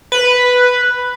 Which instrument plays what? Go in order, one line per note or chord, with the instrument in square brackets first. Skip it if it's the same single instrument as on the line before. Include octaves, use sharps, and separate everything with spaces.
[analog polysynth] B4